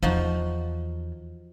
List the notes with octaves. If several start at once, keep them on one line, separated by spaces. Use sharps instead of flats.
E2 F3 D#4 F#4